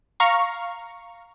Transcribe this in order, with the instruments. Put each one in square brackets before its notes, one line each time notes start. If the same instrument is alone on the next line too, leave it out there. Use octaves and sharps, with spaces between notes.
[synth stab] F5 A#5 C#6